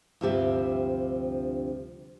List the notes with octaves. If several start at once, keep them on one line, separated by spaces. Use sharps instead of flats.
D2 G2 C3 F3 G4 E5